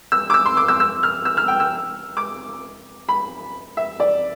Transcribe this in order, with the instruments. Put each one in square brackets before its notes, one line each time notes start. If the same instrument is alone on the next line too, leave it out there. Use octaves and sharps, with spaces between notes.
[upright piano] E6
D6
E6
C6
D6
E6
E6
F6
E6
F6
G5
E6
D6
B5
E5
D5